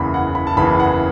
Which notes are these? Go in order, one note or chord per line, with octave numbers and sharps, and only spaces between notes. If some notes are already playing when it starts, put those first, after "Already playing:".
Already playing: F#1 E2 C#3 E3 B5
F#5
B5
A5
F#1 E2 C#3 E3 B5
F#5